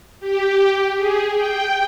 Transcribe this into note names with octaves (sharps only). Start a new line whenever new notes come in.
G4
G#4
G5